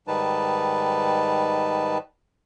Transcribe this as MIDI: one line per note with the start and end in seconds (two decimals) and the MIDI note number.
0.07 1.98 44
0.07 1.98 51
0.07 1.98 55
0.07 1.98 63
0.07 1.98 71
0.07 1.98 81